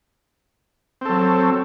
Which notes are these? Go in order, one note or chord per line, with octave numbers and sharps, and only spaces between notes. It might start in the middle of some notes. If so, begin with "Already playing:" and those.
F#3 C4 A4